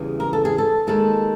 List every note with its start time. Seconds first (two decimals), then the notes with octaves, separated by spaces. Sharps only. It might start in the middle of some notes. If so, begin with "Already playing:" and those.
Already playing: E2 C#3 E3 G3
0.20 A#4
0.33 A4
0.45 G#4
0.58 A4
0.87 D#2 D#3 G#3 A4